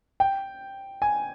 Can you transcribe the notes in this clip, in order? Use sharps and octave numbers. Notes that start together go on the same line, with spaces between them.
G5
G#5